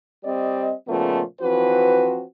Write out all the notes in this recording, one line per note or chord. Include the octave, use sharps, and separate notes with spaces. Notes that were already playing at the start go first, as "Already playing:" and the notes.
G3 C4 D5 D#5
A#2 C#3 F3 A3 B3
E3 F3 C4 F#4 B4